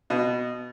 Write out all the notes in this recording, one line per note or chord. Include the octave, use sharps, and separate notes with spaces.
B2